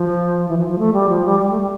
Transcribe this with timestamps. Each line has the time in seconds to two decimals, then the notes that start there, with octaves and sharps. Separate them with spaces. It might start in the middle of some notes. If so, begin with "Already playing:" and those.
Already playing: F3
0.49 E3
0.58 F3
0.69 F3
0.79 A3
0.93 G3
1.09 F3
1.25 G3
1.40 G3
1.50 A3
1.60 G3